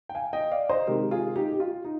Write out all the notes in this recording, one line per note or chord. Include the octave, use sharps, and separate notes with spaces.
G5
F5 G#5
D#5 G5
D5 F5
C5 D#5
C3 D#3 G#3 G4 A#4
F4 G#4
D#4 G4
G4
F4
D#4